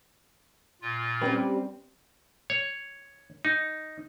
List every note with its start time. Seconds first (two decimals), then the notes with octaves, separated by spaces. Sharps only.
0.82 A#2 F4
1.21 G3 C4 C#4 B4
2.50 C#5
3.45 D#4